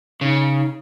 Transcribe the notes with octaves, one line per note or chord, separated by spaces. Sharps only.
C#3 D#4